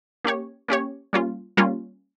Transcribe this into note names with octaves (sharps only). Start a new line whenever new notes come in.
A#3 C#4 G4 C#5
A#3 C#4 G4 C#5
G3 A#3 C#4 F4
G3 A#3 C#4 F4